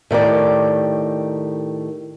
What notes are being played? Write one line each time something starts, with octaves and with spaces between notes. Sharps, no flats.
A2 D#3 G4 D5